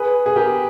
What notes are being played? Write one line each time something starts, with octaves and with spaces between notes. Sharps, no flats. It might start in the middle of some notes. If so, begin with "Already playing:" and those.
Already playing: G#4 B4
G#4
G4 A#4